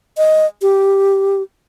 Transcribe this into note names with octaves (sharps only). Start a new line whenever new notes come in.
D#5
G4